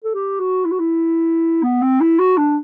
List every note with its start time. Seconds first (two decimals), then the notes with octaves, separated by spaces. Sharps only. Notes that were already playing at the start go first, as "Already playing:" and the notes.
0.04 A4
0.15 G4
0.39 F#4
0.65 E4
0.72 F#4
0.79 E4
1.63 B3
1.82 C4
2.01 E4
2.19 F#4
2.38 D4